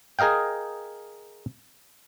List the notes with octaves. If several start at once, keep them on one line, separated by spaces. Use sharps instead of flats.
G#4 A#4 D#5 F5 G5